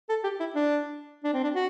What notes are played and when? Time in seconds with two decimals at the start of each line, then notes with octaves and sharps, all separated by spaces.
0.09 A4
0.24 G4
0.40 E4
0.55 D4
1.24 D4
1.33 C4
1.44 D4
1.54 F#4